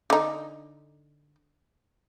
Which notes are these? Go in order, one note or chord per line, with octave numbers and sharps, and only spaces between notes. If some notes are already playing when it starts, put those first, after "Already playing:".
D3 D#4